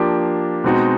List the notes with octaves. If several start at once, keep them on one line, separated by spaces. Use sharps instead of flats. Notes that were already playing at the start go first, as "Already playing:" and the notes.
Already playing: F3 A#3 D4 G4
B2 G#3 C4 D#4 F#4